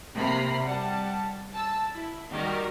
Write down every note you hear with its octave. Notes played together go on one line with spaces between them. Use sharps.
C3 A#3 A#5 B5 C7
G3 F#5 A5
A5 E6
E4
D#3 G3 F#4 G4 A#4